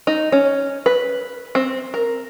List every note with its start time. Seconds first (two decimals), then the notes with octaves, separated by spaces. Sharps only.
0.07 D#4
0.32 C#4
0.86 B4
1.55 C4
1.94 A#4